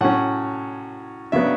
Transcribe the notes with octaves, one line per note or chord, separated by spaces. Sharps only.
A2 F#3 C#4 F#5
C#3 F#3 B3 D4 E5